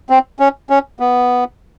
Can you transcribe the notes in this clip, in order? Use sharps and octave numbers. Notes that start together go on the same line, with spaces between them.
C4
C#4
C#4
B3